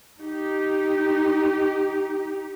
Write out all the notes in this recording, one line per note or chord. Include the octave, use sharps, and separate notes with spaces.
D#4 G4